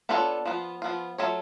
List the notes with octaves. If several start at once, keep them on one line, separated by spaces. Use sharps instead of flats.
B3 D4 F4 A4 C#5
F3 B3 F4
F3 B3 F4
F#3 A3 F4 A4 C#5